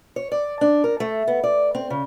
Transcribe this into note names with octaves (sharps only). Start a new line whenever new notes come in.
C#5
D5
D4
A#4
A3
B3
D5
C4
C#3